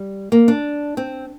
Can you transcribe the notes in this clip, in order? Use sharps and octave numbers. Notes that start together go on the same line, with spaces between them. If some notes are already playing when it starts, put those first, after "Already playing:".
Already playing: G3
A#3
D4
C4